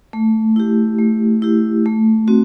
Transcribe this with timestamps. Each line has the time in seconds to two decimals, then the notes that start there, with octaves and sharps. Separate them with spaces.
0.13 A3
0.56 E4 G4
0.99 A3
1.42 E4 G4
1.86 A3
2.28 C4 F#4